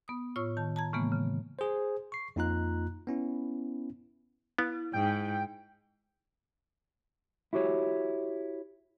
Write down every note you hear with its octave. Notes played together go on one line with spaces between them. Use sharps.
B3 D#6
A2 F4 C#5 C#6 E6
D#3 A5
A5 A#5 G#6
A2 C#3 E3 G#3 A#3 B3
C#3
G#4 C5
C#6 C7
F2 A#3 D#4 F4 A#5 F#6
B3 C#4 E4
B3 E4
G#2 G5
E4 F#4 G4 C#5